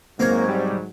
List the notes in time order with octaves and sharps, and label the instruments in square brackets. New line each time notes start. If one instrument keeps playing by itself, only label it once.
[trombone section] G#2 F#3 [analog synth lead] A#3 [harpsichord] C4 A#4 C#5
[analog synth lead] G3